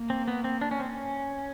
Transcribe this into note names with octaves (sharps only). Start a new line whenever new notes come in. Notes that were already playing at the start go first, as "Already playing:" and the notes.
Already playing: A#3
C4
B3
C4
D4
C#4
C4
C#4